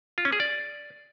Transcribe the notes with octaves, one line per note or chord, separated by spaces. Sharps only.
F4
C#4
G#4
D5